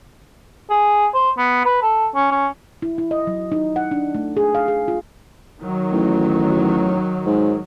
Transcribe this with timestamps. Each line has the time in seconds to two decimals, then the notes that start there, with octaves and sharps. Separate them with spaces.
0.70 G#4
1.14 C5
1.38 B3
1.65 B4
1.82 A4
2.15 C#4
2.32 C#4
2.82 E4
2.98 E4
3.11 D#5
3.27 F#3
3.52 D#4
3.76 F#5
3.91 D4
4.15 A3
4.37 G#4
4.55 F5
4.68 G#4
4.88 F4
5.60 D#3 F#3
5.92 A1
7.26 G#2